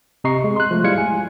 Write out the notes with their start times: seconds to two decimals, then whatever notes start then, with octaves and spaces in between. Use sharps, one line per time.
0.24 C3 D#5 A#5 C#6 C7
0.44 G#3
0.56 C6 F#6
0.71 F3 A3
0.84 G3 G#3 E4 F5 G#6 C#7
0.98 G#5